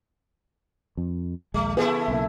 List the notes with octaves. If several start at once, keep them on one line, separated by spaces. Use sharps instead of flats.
F2
A#1 D#2 G#3 A3
C#3 E3 A3 B3 E4 G#4
B1 C#3 A#3